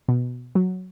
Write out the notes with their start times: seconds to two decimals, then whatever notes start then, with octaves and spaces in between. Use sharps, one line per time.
0.08 B2
0.55 F#3